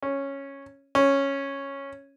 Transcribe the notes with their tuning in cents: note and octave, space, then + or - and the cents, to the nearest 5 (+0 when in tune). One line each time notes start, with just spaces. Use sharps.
C#4 -5
C#4 -5